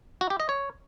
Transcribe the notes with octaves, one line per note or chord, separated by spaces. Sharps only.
F#4
G4
D#5
C#5